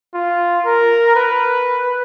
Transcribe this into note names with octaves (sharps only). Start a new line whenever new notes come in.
F4
A#4
B4